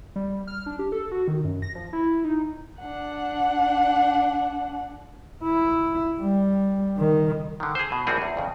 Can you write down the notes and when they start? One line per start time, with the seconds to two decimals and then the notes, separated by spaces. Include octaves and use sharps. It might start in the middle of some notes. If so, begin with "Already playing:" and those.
0.16 G3
0.47 F6
0.66 D4
0.79 G4
0.92 A4
1.12 F#4
1.28 D#3
1.44 F#2
1.62 A#6
1.75 F3
1.93 E4
2.24 D#4
2.80 D4 F#5
5.44 E4
6.19 G3
6.97 D#3
7.60 D3 D#3
7.75 G#4 C5
7.92 B2
8.07 A#1 A2 G3 C4 F#4 G#4
8.22 E2
8.37 F2 C#3